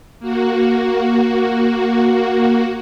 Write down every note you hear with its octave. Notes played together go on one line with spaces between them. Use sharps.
A#3 F#4